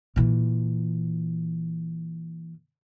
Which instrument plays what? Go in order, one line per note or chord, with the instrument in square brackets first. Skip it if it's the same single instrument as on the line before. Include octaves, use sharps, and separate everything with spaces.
[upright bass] A#2 E3